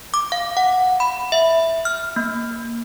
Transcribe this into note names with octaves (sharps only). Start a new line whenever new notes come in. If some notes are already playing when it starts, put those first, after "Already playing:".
D6
F5
F#5
B5
E5
F6
A#3